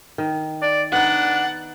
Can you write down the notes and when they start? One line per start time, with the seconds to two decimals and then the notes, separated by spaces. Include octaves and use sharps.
0.18 D#3
0.62 D5
0.93 B3 D4 D#4 F#5